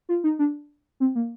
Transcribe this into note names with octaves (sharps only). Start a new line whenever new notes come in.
F4
D#4
D4
C4
A#3